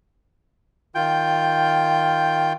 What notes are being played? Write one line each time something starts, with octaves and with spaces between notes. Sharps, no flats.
D#3 F4 G5 G6